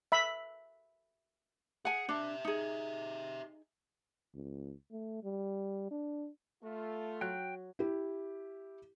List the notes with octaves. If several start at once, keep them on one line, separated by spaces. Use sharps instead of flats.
E5 B5
G#4 F#5 G#5
D4 G4 E5
D#4 G#4
C#2
A3
G3
D4
A3 F4
F#3 G5 F#6
E4 G4